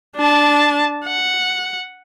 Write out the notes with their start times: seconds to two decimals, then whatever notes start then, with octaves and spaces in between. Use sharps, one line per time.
0.16 D4 A5
1.05 F#5